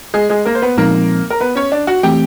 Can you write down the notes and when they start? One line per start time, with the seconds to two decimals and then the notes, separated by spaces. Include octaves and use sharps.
0.14 G#3 G#4
0.30 G#3 G#4
0.45 A#3 A#4
0.55 C5
0.62 B3 B4
0.77 A#2 F3 G#3 A#3 C4 D#4 A#4
1.30 A#4
1.40 B3 B4
1.55 C#4 C#5
1.72 D4 D5
1.87 F#4 F#5
2.03 E3 A3 C4 G4 G5